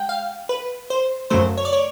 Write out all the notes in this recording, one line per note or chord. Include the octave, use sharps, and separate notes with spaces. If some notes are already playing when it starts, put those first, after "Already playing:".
Already playing: G#3 F#5 G5
F5
B4
C5
F#2 C#3 F#3 A3 C5
C#5
D5
C#5